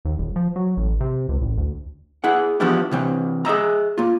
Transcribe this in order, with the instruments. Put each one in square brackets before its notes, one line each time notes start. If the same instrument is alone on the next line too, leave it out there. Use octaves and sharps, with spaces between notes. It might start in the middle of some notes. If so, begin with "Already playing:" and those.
[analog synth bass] D#2
D#1
F3
F#3
A1
C3
C#2
A1
D2
[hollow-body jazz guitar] E4 G#4 F#5
E3 F3 B3 D4 E4 G4
C3 E3 C4
G#4 D#5 E5 A#5
A#3 F4